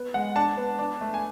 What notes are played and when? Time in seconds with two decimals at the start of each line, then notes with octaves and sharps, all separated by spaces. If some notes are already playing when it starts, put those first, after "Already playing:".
Already playing: B3
0.14 G#3 F#5
0.36 D4 A5
0.57 B3
0.79 D4
1.01 A3
1.14 G#5